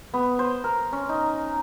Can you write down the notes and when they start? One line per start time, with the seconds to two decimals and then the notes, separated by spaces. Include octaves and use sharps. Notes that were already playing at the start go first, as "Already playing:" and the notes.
0.14 B3
0.39 C5
0.64 A#4
0.93 C#4
1.09 D#4